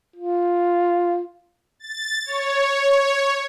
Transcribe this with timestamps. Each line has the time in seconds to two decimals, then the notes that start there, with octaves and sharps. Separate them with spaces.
0.16 F4
1.80 A6
2.25 C#5